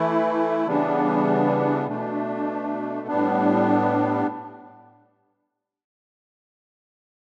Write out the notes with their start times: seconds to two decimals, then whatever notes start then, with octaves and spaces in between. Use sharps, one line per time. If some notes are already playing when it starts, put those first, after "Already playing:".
Already playing: E3 A3 E4
0.67 C#3 E3 G3 B3 D4
1.87 B2 A3 D4
3.07 A2 G3 B3 D4